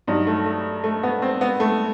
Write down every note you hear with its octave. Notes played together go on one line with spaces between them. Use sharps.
G2 F#3 D#4
A3
A3
A3
B3
C4
B3
A3